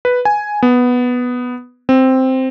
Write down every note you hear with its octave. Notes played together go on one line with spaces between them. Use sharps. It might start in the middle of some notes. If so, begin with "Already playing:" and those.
B4
G#5
B3
C4